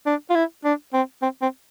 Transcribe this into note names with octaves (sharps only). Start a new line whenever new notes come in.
D4
F4
E4
D4
C4
C4
C4